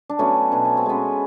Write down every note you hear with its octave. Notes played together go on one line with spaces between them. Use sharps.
D4
F#3 A3 B3 C#4
B2 D4
C#4
C4
G#3 B3 C#4